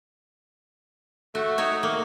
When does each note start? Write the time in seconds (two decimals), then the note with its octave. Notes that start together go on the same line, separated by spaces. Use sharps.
1.35 A3 F#4
1.58 D#4 F#4 C#5
1.83 A3 A#3